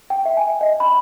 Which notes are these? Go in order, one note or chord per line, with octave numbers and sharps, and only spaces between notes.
G5
E5
G#5
D#5
B5